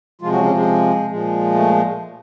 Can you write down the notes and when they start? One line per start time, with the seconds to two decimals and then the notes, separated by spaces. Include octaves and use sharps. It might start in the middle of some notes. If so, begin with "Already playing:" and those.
0.21 C3 F3 G#3 F4
0.32 F#3 F#4
0.44 C#3 C#4
0.55 G#3
1.10 A#2 F3 G#3
1.55 A3